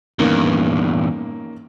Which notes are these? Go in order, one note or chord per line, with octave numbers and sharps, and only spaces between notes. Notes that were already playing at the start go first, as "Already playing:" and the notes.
E2 G2 D#3 A#3 C#4